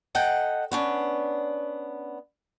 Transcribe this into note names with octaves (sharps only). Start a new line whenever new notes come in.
A4 D#5 F#5 G5
B3 C#4 D4